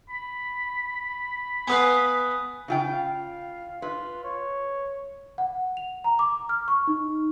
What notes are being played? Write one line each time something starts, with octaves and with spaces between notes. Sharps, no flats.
B5
B3 B4 F5 G#5 D#6 F#6
C#3 F4 G5
F5
F4 B4
C#5
F#5
F7
A#5
D6
F6
C#6
D#4